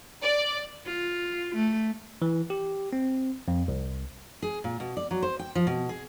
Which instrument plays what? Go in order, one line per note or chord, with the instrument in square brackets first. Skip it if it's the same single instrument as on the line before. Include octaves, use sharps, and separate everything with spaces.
[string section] D5
[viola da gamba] F4
A3
[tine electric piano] E3
G4
C4
F2
C2
[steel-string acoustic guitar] G#4
A#2
B2
D5
F#3
C5
G5
F3
B2
G#4